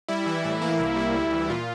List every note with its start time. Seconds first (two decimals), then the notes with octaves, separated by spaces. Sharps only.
0.08 G3 E4
0.26 E3 E4
0.44 A2 E4
0.61 A#3 E4
0.80 C2
0.96 G3
1.15 D2
1.33 E3
1.50 A#2 F4